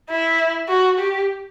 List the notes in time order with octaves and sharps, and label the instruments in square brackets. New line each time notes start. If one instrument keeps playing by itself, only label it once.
[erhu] E4
F#4
G4